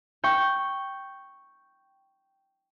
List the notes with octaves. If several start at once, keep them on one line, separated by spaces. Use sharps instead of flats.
G5 C#6